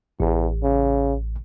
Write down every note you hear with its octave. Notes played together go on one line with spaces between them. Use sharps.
A1 E2
C#3